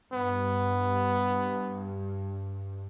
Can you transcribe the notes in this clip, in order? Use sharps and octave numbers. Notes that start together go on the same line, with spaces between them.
G2 B3